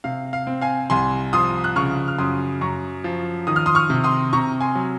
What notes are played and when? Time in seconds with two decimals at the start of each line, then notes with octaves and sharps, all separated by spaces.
0.04 C3 F5
0.33 F5
0.47 C4
0.61 F5 G#5
0.90 C2 G#5 C6
1.33 F3 C6 D#6
1.64 F#6
1.76 C#3 C#6 F6
2.08 F6
2.18 F#2 C6 D#6
2.61 F#2 A#5 C#6
3.04 F3
3.47 D#3 D#6
3.56 F6
3.66 C6 D#6
3.75 C#6 F6
3.90 C3
4.04 C6 D#6
4.33 C3 A#5 C#6
4.61 G#5 C6
4.75 F#3